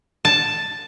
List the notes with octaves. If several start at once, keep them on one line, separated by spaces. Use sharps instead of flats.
A5